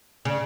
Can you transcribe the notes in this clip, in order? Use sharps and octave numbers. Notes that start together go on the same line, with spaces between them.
C#3